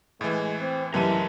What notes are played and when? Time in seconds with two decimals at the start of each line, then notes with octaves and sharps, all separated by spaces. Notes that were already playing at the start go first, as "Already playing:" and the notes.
0.21 A2 E3 G#3
0.60 C4
0.94 F#2 C3 E3 E4 A#4 D#5 A5 D#7